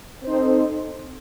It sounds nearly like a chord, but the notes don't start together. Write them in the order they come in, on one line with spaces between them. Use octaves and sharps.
C4 C5 D#4 A4